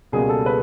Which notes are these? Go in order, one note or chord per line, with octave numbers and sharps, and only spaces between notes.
C#2 B2 G3 A#3 G#4
A4
B4